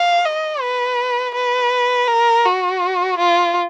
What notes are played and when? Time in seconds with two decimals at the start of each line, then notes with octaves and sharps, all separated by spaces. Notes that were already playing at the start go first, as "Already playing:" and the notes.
Already playing: F5
0.25 D#5
0.61 B4
1.35 B4
2.08 A#4
2.45 F#4
3.18 F4